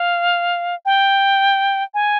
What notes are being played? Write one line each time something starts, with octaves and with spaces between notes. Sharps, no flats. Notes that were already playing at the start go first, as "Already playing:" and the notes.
Already playing: F5
G5
G#5